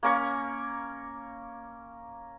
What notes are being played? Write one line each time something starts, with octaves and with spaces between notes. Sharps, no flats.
A#3 C#4 A#4 C#6